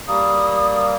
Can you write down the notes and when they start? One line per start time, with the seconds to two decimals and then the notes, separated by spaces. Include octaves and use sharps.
0.08 G3 A#3 D#6